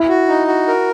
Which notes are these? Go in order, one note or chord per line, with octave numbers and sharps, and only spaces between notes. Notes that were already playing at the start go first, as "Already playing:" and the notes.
Already playing: E4
F#4
D#4
F#4
A#4